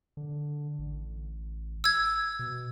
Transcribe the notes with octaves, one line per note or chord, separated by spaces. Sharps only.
D3
A1
E6 G#6
B2